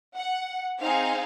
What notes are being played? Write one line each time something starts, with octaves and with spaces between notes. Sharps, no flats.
F#5
C4 D#4 G#4 F5